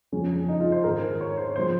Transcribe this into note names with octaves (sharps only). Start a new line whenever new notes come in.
F2 C#3 F3 C#4
D#4
F4
C5
G#2 D#3 A#4
C#5
C5
C#3 F3 C5